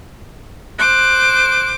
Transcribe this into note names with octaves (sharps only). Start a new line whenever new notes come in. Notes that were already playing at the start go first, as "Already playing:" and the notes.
C5 D6 F#6